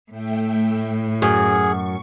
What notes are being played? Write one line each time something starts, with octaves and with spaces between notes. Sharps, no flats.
A2 A3 E5 G5
F#2 G#4 C#6